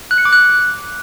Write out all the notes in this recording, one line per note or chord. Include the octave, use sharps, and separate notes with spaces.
F#6
C#7
D6
F#6